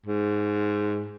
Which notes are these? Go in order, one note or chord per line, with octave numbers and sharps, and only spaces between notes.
G#2